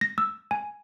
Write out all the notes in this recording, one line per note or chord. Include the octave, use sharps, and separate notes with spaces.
A#6
E6
G#5